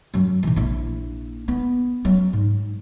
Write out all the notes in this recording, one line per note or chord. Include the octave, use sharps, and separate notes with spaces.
F#2 F#3
A#2 E3
A#1 E4
B3
F#3 C#4
G#2